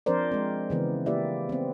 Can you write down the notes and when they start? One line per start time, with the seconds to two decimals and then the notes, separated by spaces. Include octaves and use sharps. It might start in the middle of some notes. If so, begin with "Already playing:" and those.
0.06 F3 C4 D4 A#4 C5 D5
0.31 G#3 C4
0.70 C#3 E3 B3
1.06 A#3 E4 G4 B4 D5 E5
1.49 B3 C4